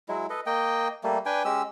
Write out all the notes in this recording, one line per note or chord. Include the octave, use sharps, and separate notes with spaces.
F#3 G#3 E4
A4 B4 D#5
A#3 D#5 G5
G3 A3 A#3
D4 B4 G5 G#5
G#3 C#4 G4 E6